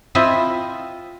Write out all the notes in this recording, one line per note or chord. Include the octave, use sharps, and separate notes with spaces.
C4 E4 F4 D#5 E5